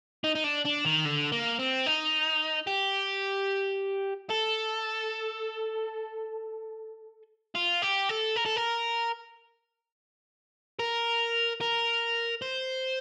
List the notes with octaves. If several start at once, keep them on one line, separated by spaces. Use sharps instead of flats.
D#4
D#4
D4
D4
D#3
D3
A#3
C4
D#4
G4
A4
F4
G4
A4
A#4
A4
A#4
A#4
A#4
C5